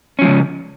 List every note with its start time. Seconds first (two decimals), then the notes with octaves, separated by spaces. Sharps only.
0.19 C#4
0.22 F3
0.24 G#3
0.27 C#3